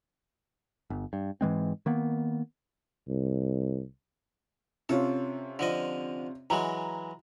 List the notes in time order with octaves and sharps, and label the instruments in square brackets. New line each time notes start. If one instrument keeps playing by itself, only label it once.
[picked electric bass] G1
G2
G#2 E3 G#3 C4
D#3 A#3 B3
[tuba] C2
[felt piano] C3 C#4 F4 [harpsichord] A4
[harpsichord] D3 F3 D#5
[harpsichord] E3 F#3 G#3 [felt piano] A#5